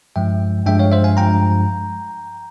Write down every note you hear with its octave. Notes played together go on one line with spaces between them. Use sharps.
G2 F3 G#3 E5 G5
G2 F3 G#3 E5 G5
C#5 F5
C5 E5
F5 G#5
G2 F3 G#3 G5 A#5